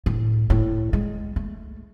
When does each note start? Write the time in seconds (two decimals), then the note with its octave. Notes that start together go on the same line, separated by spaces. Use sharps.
0.06 A2
0.50 A2
0.93 G#3
1.36 A3